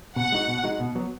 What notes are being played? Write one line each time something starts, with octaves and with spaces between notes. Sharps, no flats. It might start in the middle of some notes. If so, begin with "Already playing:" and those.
B2 F#5
G#3 D#4 F#4
B2
G#3 D#4 F#4
B2
F#3 B3